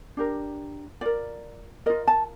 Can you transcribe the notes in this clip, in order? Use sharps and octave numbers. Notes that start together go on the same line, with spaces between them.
D4 G4 A#4
F4 A#4 D5
F4 A#4 D#5
A5